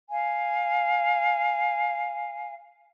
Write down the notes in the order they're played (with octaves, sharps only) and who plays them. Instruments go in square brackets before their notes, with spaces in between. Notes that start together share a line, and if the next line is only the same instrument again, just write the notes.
[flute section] F5 G#5